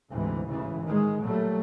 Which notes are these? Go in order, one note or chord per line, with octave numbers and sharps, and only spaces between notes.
D2 G#2 C3 E3
A1 G#2 C#3 E3
D#3 G#3
A#2 F#3 G3 A3